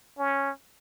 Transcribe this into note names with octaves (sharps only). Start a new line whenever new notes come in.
C#4